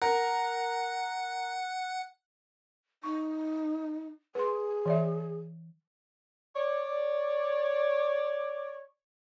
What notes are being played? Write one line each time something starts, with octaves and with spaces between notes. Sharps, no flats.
A#4 F#5
D#4 C#6
G#4 B4 C6
E3 D5 E5
C#5 D5